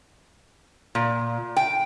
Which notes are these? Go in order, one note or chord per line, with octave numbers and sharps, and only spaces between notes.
A#2
G5